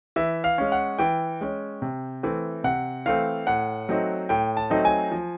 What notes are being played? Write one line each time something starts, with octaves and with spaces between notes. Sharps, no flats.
E3 E5
F5
G#3 C#4
F#5
E3 G5
G#3 C#4
C3
E3 A3 C4
C3 F#5
E3 A3 C4 F5
A2 F#5
F#3 A3 C4 D#4
A2 G5
A5
F#3 A3 C4 D#4
G#5
F3